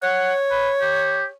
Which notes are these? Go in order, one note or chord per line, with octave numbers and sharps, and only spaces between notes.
C#5 F#5
B4
G4